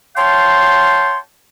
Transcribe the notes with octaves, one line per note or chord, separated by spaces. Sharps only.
C#5 F5 G5 A5 C6